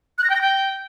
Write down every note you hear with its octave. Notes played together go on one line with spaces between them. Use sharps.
F#6
A#6
G5
A#6
G5